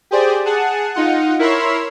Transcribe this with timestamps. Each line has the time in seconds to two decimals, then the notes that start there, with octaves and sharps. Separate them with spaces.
0.11 G4 G#4 C5 D5
0.46 G#4 F#5 A5
0.94 D#4 F4 F#5
1.39 E4 A#4 C#5 B5 C6 E6